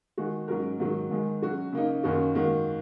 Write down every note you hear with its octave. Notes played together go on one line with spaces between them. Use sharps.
D#3 G#3 F#4
G#2 F#3 C#4 A#4
G#2 D#3 F#3
G#2 D#3 G#3
F#3 C#4 F#4
C#3 A#3 D#4
F#2 D#3 A#3 C#4 F#4
G#2 D#3 A#3 F#4